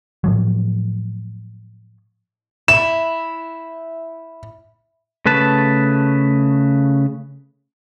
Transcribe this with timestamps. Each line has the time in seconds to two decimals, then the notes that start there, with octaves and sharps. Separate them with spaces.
0.24 A2 F3 F#3
2.68 E4 E7
5.26 C#3 A3 B4 A5